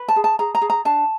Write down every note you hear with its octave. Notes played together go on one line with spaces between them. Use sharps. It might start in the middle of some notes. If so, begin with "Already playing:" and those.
Already playing: B4
A5
G#4
A5
G#4 A#5
A#5
G#4
A#5
D4 A5